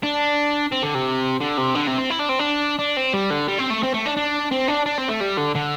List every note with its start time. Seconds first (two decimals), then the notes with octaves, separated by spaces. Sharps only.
0.03 D4
0.72 C4
0.83 D3
0.95 C3
1.41 D3
1.58 C3
1.75 D3
1.87 C3
1.98 C4
2.10 E4
2.20 D4
2.29 C4
2.39 D4
2.79 D4
2.97 C4
3.14 G3
3.30 D3
3.48 G3
3.59 C4
3.70 A3
3.83 C4
3.94 A3
4.06 D4
4.17 D4
4.52 C4
4.68 D4
4.86 D4
4.98 C4
5.08 A3
5.20 G3
5.37 D3
5.55 D3